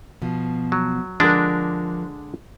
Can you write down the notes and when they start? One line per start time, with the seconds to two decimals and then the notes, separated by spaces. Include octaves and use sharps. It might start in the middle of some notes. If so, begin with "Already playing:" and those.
0.22 B2 F3
0.72 F#3
1.20 D3 F3 G#3 D4 A#4